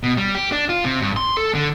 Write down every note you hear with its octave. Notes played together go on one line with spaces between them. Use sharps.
B2
G3
G4
D4
F4
C3
G2
C6
A4
D3